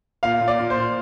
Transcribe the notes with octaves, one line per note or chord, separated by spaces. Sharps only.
A#2 F5
A#2
D5
A#2
C5
A#2